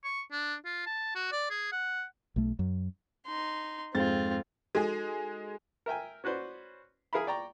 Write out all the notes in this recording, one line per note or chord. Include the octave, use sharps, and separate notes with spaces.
C#6
D4
F4
A5
F#4
D5
G#4
F#5
B1 A3
F#2
D#4 C6
F2 G#2 C4 F4 A6
G#3 D#4 F#4 G#4 A4
A#4 E5 G5 G#5
C#4 F#4 B4 C5 D5
G#4 A#4 E5 F5 B5
D5 G5 A#5 C#6